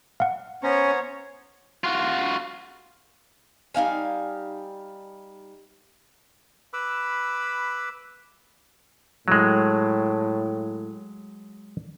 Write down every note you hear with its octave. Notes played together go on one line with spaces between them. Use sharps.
F5 F#5
B3 C#4 C5 C#5 A#5
F4 F#4
G3 D#4 F5 G#5
B4 B5 D6 E6
A2 F#3 G#3